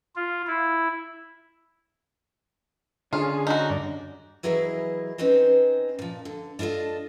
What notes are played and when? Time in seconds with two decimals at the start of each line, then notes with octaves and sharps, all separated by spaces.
0.16 F4
0.47 E4
3.13 D3 C#4 F4 G#4
3.47 D#4 F#4
3.70 G2 D5
4.43 E3 F#3 E4 G#4 A#4 D#5
5.18 C4 C#4 D#4 B4 C5
5.99 A#2 F3
6.25 D3
6.59 D4 E4 F4 A4 D#5